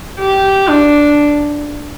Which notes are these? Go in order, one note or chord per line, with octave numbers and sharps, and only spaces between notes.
G4
D4